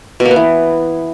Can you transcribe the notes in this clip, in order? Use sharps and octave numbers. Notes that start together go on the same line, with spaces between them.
B2
A#3
B3
E3